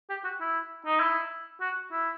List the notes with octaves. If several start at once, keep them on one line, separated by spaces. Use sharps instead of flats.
G4
F#4
E4
D#4
E4
F#4
E4